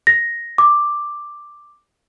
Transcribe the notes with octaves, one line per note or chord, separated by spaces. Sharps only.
A#6
D6